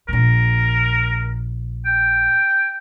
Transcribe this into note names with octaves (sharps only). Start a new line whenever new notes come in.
A#1 A#2 A#4
G5